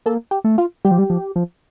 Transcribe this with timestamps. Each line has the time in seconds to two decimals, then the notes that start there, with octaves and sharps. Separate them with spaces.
0.06 A#3 A4
0.31 G4
0.44 A3
0.58 F4
0.85 G3 G4
0.91 F3
0.99 G3
1.10 F3
1.36 F3